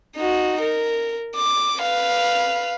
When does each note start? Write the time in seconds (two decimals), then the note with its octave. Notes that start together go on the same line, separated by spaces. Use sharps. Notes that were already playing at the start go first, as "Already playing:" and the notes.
0.16 D#4 F#4
0.61 A#4
1.36 D6
1.80 B4 F5